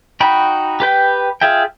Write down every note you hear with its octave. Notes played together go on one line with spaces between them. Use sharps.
D#4 F#4 G5 B5
G4 B4 G5
F4 G#4 E5 G5